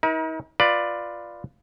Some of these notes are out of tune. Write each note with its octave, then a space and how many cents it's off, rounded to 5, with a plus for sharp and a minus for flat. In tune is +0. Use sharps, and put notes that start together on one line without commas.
D#4 +45 A#4 +40
F4 +0 B4 +0 D5 +10